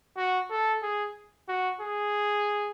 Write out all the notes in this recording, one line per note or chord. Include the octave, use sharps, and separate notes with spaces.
F#4
A4
G#4
F#4
G#4